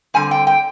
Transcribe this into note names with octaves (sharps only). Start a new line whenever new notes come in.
D3 G3 C4 G#5
G5
G5